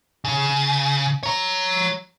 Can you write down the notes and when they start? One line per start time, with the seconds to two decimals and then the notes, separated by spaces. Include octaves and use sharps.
0.25 C#3
1.23 C#5 A#5